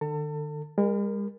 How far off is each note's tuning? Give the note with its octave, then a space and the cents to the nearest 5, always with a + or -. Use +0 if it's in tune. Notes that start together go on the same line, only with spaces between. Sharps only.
D#3 -45 A4 +25 A5 +35
G#3 -45 A#4 +0